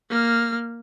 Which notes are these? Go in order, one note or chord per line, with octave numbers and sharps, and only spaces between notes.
A#3 F6